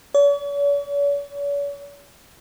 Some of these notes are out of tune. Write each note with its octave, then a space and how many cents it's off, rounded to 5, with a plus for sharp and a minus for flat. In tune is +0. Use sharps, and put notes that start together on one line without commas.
C#5 +45